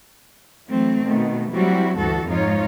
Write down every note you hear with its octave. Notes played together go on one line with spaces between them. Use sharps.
E3 F#3 A3 C4
B2 D#3 A3
F#3 G3 C4 E4 F#4
D2 G2 E3 F#4 A4
F2 G#2 D#4 F4 C#5